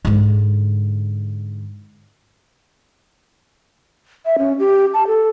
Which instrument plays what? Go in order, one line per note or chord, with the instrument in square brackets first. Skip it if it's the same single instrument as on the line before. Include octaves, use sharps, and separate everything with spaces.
[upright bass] G#2 D3
[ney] E5
C#4
G4
A5
A4